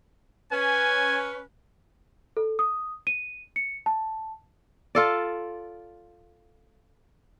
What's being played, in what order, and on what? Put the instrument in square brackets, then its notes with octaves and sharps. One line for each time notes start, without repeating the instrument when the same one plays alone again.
[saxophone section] C#4 B4 [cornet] G#5
[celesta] A4
D#6
D#7
C#7
A5
[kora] F4 A4 D5